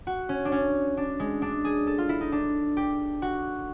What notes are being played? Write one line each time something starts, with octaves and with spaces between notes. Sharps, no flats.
F#4
C#4
D4
C#4
D4
G#3
D4
G#4
A4
F4
E4
D#4
D4
G4
F#4